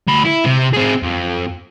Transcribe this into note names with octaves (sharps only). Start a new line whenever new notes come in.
D2 B5
E4
C3
C4 G#4
F2